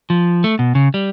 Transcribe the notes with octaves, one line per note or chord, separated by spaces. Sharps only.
F3
A3
B2
C#3
G3